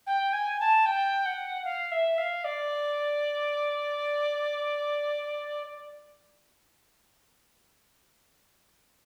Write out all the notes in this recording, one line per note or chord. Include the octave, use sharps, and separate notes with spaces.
G5
G#5
A5
G5
F#5
F5
E5
F5
D5